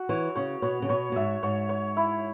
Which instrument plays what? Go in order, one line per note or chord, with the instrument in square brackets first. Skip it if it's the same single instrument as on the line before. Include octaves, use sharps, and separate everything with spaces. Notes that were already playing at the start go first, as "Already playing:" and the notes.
Already playing: [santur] F#4
[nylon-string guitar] E3 [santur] C#5
[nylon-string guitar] C#3 [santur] C#5
[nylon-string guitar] B2 [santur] C#5
[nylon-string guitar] C#3
[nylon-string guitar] B2 [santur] C#5
[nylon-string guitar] B2
[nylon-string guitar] G#2 [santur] E5
[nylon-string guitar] G#2 [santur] C#5
[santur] C#5
E4